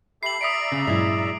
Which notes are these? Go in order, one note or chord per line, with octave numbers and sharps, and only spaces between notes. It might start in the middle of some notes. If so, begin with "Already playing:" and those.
G4 A4 E5 B5 C7 F#7
D5 E5 A#5 D#6 B6 C#7 D7
C#3
G2 A#2 F#3 G#3 E4